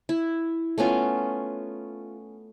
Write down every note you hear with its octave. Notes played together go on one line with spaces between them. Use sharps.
E4
A3 B3 C#4 F4